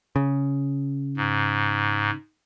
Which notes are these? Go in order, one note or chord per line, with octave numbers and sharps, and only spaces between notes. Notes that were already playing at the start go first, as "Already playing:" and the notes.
C#3
G#2